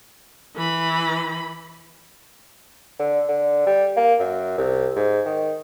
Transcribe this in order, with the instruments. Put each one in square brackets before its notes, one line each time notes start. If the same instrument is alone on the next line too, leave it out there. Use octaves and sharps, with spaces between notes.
[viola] E3 B5
[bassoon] D3
D3
G3
A#3
F#2
C2
G#2
D#3